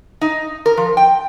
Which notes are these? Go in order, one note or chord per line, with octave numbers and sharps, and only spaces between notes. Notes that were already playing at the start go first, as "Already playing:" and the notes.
D#4
A#4
F3
G5